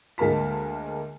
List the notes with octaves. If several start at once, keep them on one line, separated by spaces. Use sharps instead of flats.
D2 G#3 A#3 A#4 A5 B6